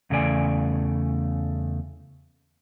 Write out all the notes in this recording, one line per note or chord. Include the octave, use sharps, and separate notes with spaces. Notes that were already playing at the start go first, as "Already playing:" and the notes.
E2 C#3 A3 F4 D5 G#5